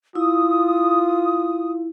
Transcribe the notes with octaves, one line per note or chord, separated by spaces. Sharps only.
E4 F4 D#6